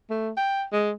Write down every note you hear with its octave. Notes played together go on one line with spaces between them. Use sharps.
A3
G5
G#3